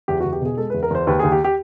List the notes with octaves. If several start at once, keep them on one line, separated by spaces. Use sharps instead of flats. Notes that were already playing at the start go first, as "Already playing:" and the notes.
E2 G4
F#4
E2
G4
B2 G#4
G#3 A4
B4
E2
A#4
E2 C5
D#2 B4
D#2 G#4
G4
G4